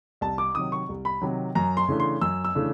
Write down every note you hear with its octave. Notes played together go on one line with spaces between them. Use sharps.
C2 A5
D6
C3 D#3 F#3 D#6
C#6
C2
B5
C3 D#3 F#3
F#2 A#5
C6
C#3 E3 A3 D4
C6
F#2 E6
E6
C#3 E3 A3 D4